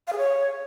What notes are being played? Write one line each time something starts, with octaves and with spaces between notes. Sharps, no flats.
F5
G#4
C#5